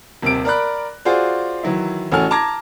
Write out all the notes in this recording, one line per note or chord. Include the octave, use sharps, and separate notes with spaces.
D#1 C3 D7
A#4 D5 B5 F#6
F4 F#4 G#4 C5 D5
D#3 E3 F#3 E4
A1 C#4 F#4 A4 G#5 F6
A5 A#5 D6 G#6 A#6